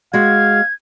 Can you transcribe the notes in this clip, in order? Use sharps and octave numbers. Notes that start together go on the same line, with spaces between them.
G#3 F#4 F5 G#6